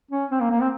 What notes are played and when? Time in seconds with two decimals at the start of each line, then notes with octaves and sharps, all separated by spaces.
0.11 C#4
0.31 C4
0.41 A#3
0.51 A#3
0.61 C4